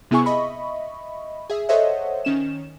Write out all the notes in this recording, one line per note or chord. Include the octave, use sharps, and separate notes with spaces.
C3 B3 E4 G#4 G#5 C#6
D#5 E5 B5 C#6
G#4 E5
A4 C5 C#5 D#5 E5 F#5
D#3 C#4 E7